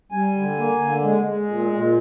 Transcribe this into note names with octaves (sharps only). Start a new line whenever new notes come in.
G3 G#5
D3
A#3
D3
G#3
G#3
A#2
A#2